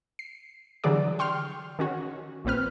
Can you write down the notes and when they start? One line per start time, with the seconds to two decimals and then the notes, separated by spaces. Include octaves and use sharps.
0.19 C7
0.84 D3 E3 F#3 G3 G#4 D5
1.19 G5 C6 C#6 F6
1.79 D#3 C#4 F#4
2.45 A#1 A#2 C4 B4 F6